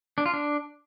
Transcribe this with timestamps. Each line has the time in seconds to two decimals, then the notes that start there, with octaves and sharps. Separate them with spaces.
0.18 D4
0.26 F4
0.33 D4